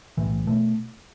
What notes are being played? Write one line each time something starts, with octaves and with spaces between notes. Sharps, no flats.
B1 A2 E3
B2 A3